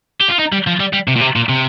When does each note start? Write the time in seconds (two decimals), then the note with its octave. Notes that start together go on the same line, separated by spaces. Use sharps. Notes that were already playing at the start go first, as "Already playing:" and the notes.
0.21 G4
0.29 F4
0.39 D#4
0.52 G3
0.67 F3
0.80 G3
0.93 G3
1.08 C3
1.16 A#2
1.21 C3
1.36 A#2
1.49 C3